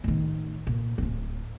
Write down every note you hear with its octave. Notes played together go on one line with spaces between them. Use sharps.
A1 D#3
A#2
D1 G1